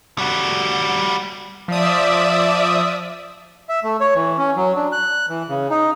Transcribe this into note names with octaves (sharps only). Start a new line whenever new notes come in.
G3 F#4
F3 D5 E5 D#6
E5
A3
C#5
E3
C#4
F#3
D4
F#6
E3
C#3
D#4